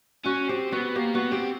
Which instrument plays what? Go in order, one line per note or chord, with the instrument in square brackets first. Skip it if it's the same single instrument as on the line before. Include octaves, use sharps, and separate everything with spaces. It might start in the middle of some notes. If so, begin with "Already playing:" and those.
[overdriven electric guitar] C#4 [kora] F#4
[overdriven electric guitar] C4 [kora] G4
[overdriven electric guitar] B3 [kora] F#4
[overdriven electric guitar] A#3 [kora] G4
[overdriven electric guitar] B3 [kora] F#4
[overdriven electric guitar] C4 [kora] G4